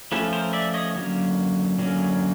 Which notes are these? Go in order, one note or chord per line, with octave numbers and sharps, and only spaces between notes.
F3 A3 C#4 A4 B4
A#4 C5
D5 E5
C#5 D#5
D3 F#3 A#3 C#4
D3 F#3 A#3 C#4